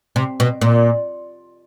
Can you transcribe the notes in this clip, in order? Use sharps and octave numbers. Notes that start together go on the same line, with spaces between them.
C3
B2
A#2